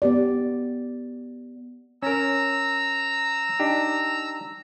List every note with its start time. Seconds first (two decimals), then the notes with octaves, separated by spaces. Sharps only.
0.02 B3 G4 D5
2.02 C#4 A#4 A#5 E6
3.59 D4 D#4 G4